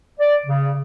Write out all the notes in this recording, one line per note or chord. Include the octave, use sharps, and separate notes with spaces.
D5
C#3